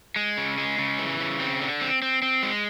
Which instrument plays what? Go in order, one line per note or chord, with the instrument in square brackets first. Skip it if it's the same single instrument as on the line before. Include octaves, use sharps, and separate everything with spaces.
[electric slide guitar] G#3
C#3
G#3
C#3
E3
C#3
C4
D3
C4
C4
C4
G#3